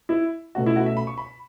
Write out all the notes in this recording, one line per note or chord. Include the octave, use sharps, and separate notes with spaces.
E4
B2 A3 C#4 F#4
E4
F#4
E5
B5
C#6
B5